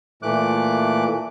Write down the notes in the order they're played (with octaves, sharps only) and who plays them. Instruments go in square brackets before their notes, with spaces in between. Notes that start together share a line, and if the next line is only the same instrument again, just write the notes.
[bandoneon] A#2 E3 A3 D6 F#6